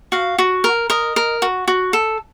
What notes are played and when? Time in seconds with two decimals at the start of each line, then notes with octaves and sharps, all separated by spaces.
0.12 F#4 F5
0.38 F#4
0.64 A#4
0.90 A#4 D#5
1.16 A#4
1.42 F#4
1.68 F#4
1.93 A4